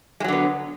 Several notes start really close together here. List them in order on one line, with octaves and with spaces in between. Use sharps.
G#3 F#3 D3 B3